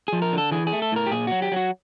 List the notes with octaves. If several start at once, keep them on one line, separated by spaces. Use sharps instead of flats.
F3 G#4
A#4
D3 A4
E3 G#4
G#4
A3
A4
A2 A#4
G4
A#2 G#4
F#3 F#4
G4
F#3 F#4